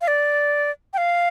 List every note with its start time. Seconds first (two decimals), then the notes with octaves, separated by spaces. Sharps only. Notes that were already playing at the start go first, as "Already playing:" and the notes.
0.01 F5
0.08 D5
0.93 G5
0.98 F5